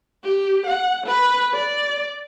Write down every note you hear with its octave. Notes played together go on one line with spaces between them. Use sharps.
G4
F#5
B4
D5